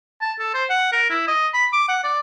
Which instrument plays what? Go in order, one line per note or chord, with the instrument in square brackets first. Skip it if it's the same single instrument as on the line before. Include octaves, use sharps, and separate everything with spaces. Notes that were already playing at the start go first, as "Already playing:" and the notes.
[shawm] A5
A4
C5
F#5
A#4
E4
D#5
B5
D6
F#5
D5